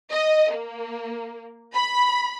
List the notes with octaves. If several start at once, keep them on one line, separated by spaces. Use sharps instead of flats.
D#5
A#3
B5